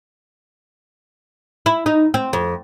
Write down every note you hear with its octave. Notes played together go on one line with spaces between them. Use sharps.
E4
D#4
C4
F2